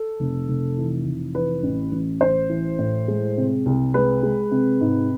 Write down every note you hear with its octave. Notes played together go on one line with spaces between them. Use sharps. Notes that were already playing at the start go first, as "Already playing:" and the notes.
Already playing: A4
F1
F1
E3
F1
E3 B4
A1
A1
A1 C5
E3
A2
G#3
C3
C2
G#3 B4
G#3
C3
G#2